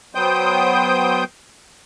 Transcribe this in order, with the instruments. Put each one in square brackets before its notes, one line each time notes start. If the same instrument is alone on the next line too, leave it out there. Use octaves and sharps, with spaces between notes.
[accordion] F#3 B3 C5 G5 D#6 G6